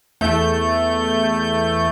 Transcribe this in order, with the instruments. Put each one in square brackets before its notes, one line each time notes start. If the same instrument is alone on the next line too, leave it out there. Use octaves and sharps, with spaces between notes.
[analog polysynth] E2 A3 G6